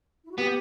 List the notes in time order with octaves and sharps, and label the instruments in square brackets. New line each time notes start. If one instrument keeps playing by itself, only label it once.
[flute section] E4
F#4
[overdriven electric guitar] B3 [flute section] G4